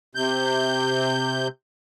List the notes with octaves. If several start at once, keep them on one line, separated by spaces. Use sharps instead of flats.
C3 G6